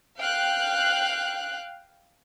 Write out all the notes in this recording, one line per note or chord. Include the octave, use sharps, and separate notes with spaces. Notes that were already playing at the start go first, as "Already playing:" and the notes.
F5 G5 F#6